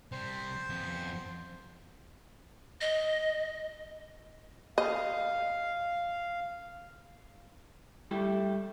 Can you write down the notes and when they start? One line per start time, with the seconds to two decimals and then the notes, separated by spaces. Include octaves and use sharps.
0.12 C3 G3 C5
0.70 F2 B3
2.81 D#5
4.78 D#5 F5
8.11 G3 A3 E4 G4